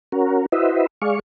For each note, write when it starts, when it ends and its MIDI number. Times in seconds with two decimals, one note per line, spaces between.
0.12 0.46 61
0.12 0.46 66
0.12 0.46 70
0.52 0.86 64
0.52 0.86 66
0.52 0.86 71
0.52 0.86 72
0.52 0.86 75
0.52 0.86 76
1.02 1.19 56
1.02 1.19 68
1.02 1.19 74
1.02 1.19 77
1.02 1.19 85